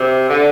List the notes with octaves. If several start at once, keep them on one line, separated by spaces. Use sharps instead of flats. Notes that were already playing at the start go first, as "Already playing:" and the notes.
Already playing: C3
D3